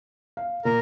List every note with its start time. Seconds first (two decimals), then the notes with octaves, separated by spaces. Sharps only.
0.37 F5
0.65 A#2 A#4